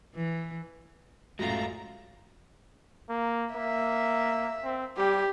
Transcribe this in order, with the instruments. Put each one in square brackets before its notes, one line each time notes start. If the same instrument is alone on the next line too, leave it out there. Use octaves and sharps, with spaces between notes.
[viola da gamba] E3
[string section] A1 F#2 A#5 [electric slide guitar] G#3 A3 F4 [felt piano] F#4
[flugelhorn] A#3
[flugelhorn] A#3 [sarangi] E5
[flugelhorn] C4
[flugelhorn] G3 [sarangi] G4